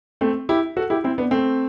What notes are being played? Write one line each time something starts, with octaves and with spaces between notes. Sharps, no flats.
A3 C4
E4 G4
F#4 A4
E4 G4
C4 E4
B3 D4
A3 C4